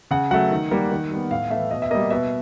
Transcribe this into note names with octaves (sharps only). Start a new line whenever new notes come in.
C#3 F#5
F#3 A3 F#5
D#3
G3 A#3
D#3
G3 B3
A2 F5
E3 A3 E5
B2 D#5
E5
G3 A#3 D#5
B2 E5